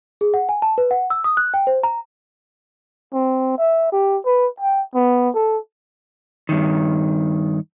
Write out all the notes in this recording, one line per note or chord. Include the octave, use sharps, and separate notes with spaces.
G#4
F#5
G#5
A5
B4
F#5
E6
D#6
F#6
G5
C5
A#5
C4
E5
G4
B4
G5
B3
A4
G2 D#3